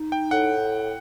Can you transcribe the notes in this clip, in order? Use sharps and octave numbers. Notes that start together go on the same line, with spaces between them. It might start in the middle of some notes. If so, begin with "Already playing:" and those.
Already playing: D#4
G5
A2 F#5